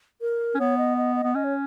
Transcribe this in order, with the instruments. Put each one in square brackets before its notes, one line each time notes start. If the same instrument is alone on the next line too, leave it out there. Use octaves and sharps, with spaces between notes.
[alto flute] A#4
[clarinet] C#4
[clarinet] B3 [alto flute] C#5
[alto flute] D#5
D#5
D#5
[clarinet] B3
[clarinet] C#4 [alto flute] D#5
[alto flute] C#5